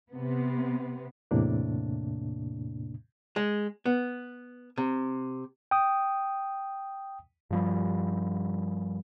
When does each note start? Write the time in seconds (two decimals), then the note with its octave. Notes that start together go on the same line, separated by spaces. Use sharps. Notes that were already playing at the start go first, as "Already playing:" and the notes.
0.13 C3 B3
1.31 E2 A2 C3 A#3 D4
3.36 G#3
3.86 B3
4.78 C3
5.71 G5 D#6
7.50 G2 F3 G3